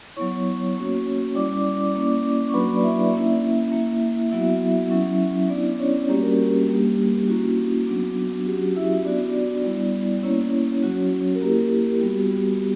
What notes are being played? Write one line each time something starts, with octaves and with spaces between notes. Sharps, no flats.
F#3 B3 E4 C#5 C#6
A#3 C#4 F#4
G3 C#4 E4 D5 D6
A#3 C#4 E4
C#6
F#3 A#3 D4 F#4 B4 B5
D5
E4 E5
A#3 C#4 E4
A#3 E4
F#3 B3 E4 F#4 E5
F#3 C#4 E4
B3 D4 E4 D5
C#4 C#5
G3 A#3 C#4 F#4 G4
A#4
G4
G3 A#3 D4
A#3 C#4 E4 F#4
F#3 B3 D4
F#3 C#4 F#4 G4
E4 E5
B3 D4 F#4 D5
G3 B3 E4
A#3 C#4 E4 C#5
F#3 C#4 F#4
A#4
A#3 E4 G4
G3 B3 F#4